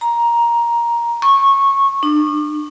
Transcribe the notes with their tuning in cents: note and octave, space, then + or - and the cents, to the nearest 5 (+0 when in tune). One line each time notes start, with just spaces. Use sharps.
A#5 +10
C#6 -15
D4 +35